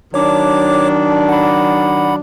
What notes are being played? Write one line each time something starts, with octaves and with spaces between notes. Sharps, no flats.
D#3 F#3 D4 C#5 D6
F#5 B5